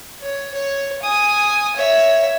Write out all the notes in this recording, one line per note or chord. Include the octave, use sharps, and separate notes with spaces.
C#5
C#5
G#5 D#6
C#5 E5